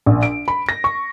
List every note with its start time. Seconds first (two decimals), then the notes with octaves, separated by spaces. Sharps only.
0.06 A#1
0.23 D7
0.48 B5
0.69 A#6
0.84 C#6